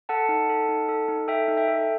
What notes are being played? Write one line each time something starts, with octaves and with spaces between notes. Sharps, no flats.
A4 F#5 A5
D#4
A4
D#4
A4
D#4
A4 E5 G5
D#4
E5 G5
A4